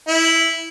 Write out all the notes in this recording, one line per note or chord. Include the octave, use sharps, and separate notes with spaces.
E4